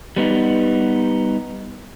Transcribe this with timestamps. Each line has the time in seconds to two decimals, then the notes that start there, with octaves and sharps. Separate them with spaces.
0.16 G3 B3 D#4